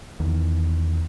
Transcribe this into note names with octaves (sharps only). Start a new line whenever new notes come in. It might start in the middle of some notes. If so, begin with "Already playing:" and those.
E2 D#3